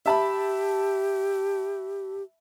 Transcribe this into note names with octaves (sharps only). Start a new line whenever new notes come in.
G4 E5 A5 B5